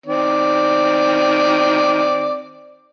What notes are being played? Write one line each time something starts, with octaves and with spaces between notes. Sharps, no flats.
D#3 C4 D5